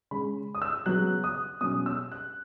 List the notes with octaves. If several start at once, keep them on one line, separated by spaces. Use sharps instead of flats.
C#3 G#3 C#4 B5
D#6
E6
C#3 F#3 B3 F#6
D#6
B2 F#3 C#4 D#6
E6
F#6